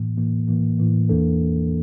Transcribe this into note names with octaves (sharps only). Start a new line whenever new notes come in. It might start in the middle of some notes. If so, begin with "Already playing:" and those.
Already playing: A2 E3 A#3
A2 E3 A#3
A2 E3 A#3
A2 E3 A#3
E2 E3 A#3 D4 A4